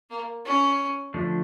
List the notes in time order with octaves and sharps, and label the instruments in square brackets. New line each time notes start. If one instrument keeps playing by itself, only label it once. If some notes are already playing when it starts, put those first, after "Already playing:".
[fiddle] A#3
C#4
[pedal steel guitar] D3 F3 A3 D4